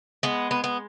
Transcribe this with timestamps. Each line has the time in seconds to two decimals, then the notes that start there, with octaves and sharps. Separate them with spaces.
0.23 G#3 B3
0.51 B3
0.64 B3